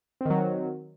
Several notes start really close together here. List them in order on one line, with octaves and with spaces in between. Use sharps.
C4 D#3 F#3